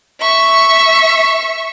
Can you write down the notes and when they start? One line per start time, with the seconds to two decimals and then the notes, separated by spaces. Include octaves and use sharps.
0.20 E5 C#6